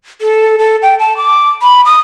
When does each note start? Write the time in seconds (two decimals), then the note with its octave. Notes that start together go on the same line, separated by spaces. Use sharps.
0.21 A4
0.58 A4
0.82 G5
0.99 A5
1.17 D6
1.62 B5
1.85 D#6